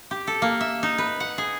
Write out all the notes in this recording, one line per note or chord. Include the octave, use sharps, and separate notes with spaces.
G4
A4
A#3
E5
D#4
B4
F#5
G#4